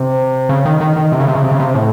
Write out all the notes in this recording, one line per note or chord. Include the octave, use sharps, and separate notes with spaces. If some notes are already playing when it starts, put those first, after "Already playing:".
Already playing: C3
C#3
D#3
D#3
D#3
C3
C#3
C3
C#3
C3
C#3
C3
A2